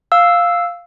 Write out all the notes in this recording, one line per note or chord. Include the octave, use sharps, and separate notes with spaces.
F5 E6